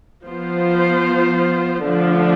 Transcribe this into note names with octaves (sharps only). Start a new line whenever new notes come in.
F3 B3 F4 C5
D3 F3 A3 D4